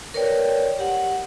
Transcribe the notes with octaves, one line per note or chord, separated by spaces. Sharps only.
A#4 B4 C#5 D5 G5
G4 F#5